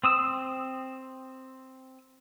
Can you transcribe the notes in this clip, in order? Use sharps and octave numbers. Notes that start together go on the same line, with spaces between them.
C4 D#6 E6